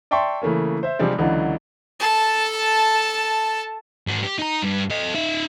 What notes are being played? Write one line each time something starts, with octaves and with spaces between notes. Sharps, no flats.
D5 E5 G5 A5 C6 C#6
C#3 E3 A3 A#3 C#4
C5 E5
C3 F3 G3 G#3 C4 D4
C#2 D3 E3 F#3
A4 A5
G#2 F#4
G4
D#4 A#5
G2
A4 D#5
D#4 E5